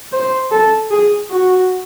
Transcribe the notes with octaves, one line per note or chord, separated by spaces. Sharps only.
C5
A4
G#4
F#4